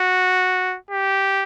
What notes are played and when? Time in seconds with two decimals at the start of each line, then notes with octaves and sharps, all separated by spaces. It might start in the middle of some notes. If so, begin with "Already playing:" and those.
Already playing: F#4
0.91 G4